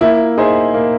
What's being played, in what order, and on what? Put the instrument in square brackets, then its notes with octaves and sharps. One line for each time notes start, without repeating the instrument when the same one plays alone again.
[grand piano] A#3 [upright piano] E4
[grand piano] D#4 G#4 C5 E5
A#3